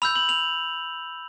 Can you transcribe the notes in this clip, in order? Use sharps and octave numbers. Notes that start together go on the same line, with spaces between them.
B5 E6 G6 F7
F#7
F7